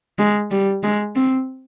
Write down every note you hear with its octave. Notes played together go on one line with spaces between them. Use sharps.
G#3
G3
G#3
C4